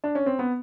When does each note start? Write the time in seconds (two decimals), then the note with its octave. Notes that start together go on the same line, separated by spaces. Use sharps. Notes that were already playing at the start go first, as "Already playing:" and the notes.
0.04 D4
0.15 C#4
0.26 C4
0.39 B3